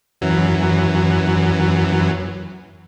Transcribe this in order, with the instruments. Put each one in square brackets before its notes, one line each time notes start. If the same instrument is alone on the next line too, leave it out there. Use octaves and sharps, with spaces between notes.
[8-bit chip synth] F#2 E3 F#3